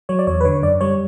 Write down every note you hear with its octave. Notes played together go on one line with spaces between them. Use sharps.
F#3 C#5
D5
E2 C#5
B4
D3 C#5
F#2 D5
G3 C#5